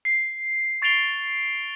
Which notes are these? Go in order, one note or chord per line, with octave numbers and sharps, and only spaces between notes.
C7
C#6 A6 C7 D7 F7 G7